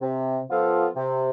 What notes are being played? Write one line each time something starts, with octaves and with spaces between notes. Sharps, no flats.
C3
F3 B3 F4 A4
C3